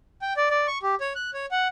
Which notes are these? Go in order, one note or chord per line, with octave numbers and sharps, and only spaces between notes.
G5
D5
D5
C#6
G4
C#5
F#6
C#5
F#5